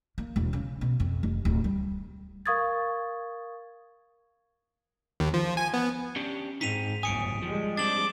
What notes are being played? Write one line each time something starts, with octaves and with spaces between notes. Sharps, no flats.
A#3
E1
C#3
B2
F2
F1
D1
G3
A#4 F5 C#6 D#6 G#6 A6
D#2
F3
G#5
B3
C#4 D4 G4
G#2 C4 D#4 B6 D#7 F7
G1 C#2 F#2 A2 G#5 D#6 C#7 D7
F3 G3 G#3
C4 D4 D6 A6 F#7